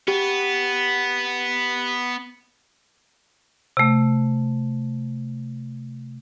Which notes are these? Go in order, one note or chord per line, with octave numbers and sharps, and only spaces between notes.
B3 G4
C3 A3